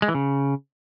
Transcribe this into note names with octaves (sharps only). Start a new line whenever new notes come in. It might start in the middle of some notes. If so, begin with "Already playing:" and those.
G#3
E3
C#3